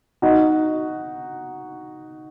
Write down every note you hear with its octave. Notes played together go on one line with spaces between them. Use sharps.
D#4 F#4